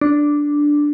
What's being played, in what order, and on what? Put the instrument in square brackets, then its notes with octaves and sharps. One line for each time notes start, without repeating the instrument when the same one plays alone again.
[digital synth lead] D4